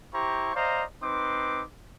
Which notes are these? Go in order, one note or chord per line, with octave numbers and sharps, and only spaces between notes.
E4 G4 C5 A#5 C#6
C5 D5 D#5 F5 A#5
C4 D#4 B4 C6 D6